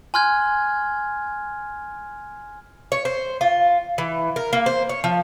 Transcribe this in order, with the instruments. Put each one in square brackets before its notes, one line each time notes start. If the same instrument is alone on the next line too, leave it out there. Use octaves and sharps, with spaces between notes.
[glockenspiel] G#5 C6 F6 F#6 G#6
[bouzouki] C#5
C5
F4
E3
A#4
A#3
C5
C#5
F3